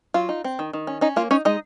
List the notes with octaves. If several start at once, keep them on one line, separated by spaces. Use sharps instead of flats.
F#3 F4
D#4
C4
D#3
D#3
C#4
C#4 D#4
A#3 F4
C#4 D#4 C#5
G#3 D#4 D#5